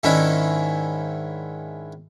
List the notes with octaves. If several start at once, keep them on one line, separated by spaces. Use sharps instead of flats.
G#2 D#3 C#4 D4 E4